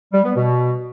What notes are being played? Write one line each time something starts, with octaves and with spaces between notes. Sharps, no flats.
G3
B3
B2